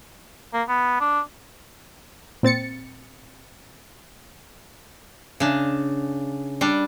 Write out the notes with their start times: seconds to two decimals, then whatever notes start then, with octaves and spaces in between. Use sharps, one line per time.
0.53 A#3
0.68 B3
1.01 D4
2.43 A#2 C4 A6 C#7
5.40 C#3 D4
6.61 G3 D4